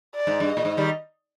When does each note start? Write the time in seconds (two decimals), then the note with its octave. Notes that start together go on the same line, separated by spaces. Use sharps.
0.16 D5
0.27 G#2
0.40 G2
0.52 A#2 D#5
0.65 G#2
0.77 D#3 G3